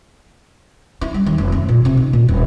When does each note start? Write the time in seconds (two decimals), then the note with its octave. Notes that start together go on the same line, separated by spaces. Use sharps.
1.01 E4
1.14 G3
1.26 D#2
1.38 F1
1.52 A3
1.68 A#2
1.85 C3
1.97 D#4
2.13 A#2
2.28 D#1